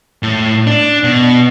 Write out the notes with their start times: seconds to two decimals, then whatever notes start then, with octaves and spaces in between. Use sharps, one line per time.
0.23 A2
0.67 D4
1.04 B2